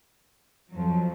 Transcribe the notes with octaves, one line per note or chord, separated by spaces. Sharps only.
F2 F3 F#3